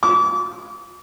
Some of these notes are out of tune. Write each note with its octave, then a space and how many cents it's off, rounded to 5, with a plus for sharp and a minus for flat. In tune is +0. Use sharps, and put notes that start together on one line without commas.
D6 -35